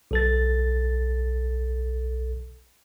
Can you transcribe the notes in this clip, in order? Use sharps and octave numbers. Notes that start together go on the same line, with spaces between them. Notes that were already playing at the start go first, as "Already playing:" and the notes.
B1 A4 A6